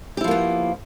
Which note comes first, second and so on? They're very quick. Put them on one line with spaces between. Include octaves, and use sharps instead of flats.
G4 E4 F3 A#3 B3